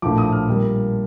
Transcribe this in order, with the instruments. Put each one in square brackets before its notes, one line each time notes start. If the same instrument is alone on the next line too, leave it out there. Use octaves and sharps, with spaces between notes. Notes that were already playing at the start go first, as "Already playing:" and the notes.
[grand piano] A#1 A2 F3 D6
D#6
F6
A#2 G3 A#3